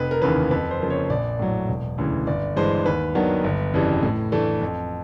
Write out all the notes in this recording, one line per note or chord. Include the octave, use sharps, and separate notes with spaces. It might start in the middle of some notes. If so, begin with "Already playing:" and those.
Already playing: F1 B4
A#4
D#2 C#3 E3 B4
F2 B4
C5
C#3 F3 A#3
C#5
A#1 D5
A2 F#3
E1
D2 C#3 E3
G1 D5
G2 E3 G#3 C5
D#2 B4
D#3 F#3 B3 D4
G1
F2 C#3 E3 G3
A2
E3 A3 D4
F2